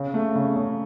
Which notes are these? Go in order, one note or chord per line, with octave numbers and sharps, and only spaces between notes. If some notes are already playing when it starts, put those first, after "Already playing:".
Already playing: C#3
A3
C#3
C#3